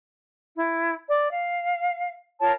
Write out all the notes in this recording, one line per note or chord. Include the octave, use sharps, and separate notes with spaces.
E4
D5
F5
F4 A#4 C#5 A5